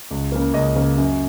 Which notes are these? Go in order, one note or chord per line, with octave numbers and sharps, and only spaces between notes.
C#2
C#3 A#3
C#2 D#5
C#3 A#3
F#2